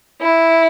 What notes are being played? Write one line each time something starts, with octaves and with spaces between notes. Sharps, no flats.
E4